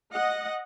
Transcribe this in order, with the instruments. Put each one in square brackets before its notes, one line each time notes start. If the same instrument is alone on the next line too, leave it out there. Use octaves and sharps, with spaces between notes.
[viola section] D#5 F#5